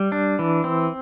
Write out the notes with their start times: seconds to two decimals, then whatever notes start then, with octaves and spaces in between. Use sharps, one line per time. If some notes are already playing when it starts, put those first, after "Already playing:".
Already playing: G3
0.12 D4
0.39 E3
0.64 C4